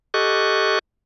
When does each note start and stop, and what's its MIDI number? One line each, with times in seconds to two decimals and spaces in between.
0.14 0.79 67
0.14 0.79 69
0.14 0.79 75
0.14 0.79 85
0.14 0.79 90